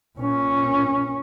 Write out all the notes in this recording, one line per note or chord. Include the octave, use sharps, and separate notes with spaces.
A#2 C#4